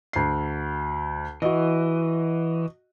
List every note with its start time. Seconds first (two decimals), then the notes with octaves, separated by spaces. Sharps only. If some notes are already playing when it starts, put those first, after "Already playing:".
0.13 D2 C7
1.42 E3 F#4 D#5